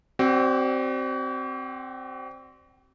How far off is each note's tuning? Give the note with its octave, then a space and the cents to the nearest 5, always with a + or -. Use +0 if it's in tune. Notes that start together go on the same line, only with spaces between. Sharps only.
C4 +5 F#4 +45 D5 +0